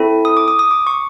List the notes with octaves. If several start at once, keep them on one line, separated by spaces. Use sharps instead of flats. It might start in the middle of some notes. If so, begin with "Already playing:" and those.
Already playing: C4 E4 A4
D#6
D6
D#6
D#6
D6
C#6